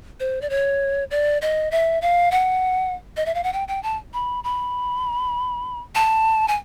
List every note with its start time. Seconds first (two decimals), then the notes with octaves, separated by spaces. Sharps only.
0.20 C5
0.42 D5
0.50 C#5
1.11 D5
1.42 D#5
1.71 E5
2.02 F5
2.32 F#5
3.17 D#5
3.26 E5
3.35 F5
3.44 F#5
3.53 G5
3.68 G5
3.83 A5
4.14 B5
4.44 B5
5.95 A5
6.48 G#5